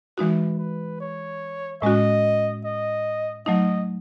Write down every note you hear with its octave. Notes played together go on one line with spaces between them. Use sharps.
E3 G#3 D#4 F#4 B4
B4
C#5
A2 G#3 C#4 F#4 D#5
D#5
F#3 A3 D#4 D#5